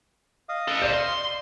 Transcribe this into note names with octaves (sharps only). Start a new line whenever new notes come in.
D#5 F5 D#6
A4 B4
G4 C5 D5
C6